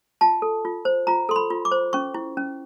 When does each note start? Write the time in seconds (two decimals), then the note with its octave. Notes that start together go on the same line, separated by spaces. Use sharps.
0.21 F4 A5
0.42 A4
0.65 F4
0.85 C5
1.07 F4 A#5
1.29 A4 C6
1.36 B5
1.50 F4
1.65 D6
1.72 C5
1.93 C#4 C#6
2.14 E4
2.37 C#4